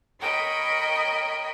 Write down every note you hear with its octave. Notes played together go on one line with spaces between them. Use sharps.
A#4 C#5 D#5 G5 B5